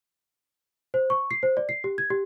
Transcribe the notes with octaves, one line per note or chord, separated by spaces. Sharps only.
C5
C#6
C7
C5
D5
C7
G4
G#6
G4